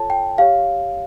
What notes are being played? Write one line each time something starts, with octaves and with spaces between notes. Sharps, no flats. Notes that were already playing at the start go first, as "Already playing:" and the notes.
Already playing: F4 A4 C#5 A5
G5
G4 C#5 F5